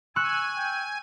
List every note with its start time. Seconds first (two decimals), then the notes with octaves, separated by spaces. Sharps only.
0.16 G#5 C#6 E6 F#6
0.57 G5